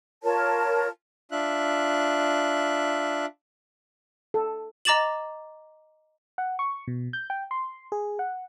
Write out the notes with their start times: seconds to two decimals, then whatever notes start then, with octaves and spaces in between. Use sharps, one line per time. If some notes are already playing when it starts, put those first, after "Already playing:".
0.23 F4 A#4 C#5 A5
1.32 D4 F4 E5 F#6
4.34 A4
4.85 D#5 A#5 D6 A6 E7 F#7
6.38 F#5
6.59 C#6
6.88 B2
7.13 G6
7.30 G5
7.51 C6
7.92 G#4
8.19 F#5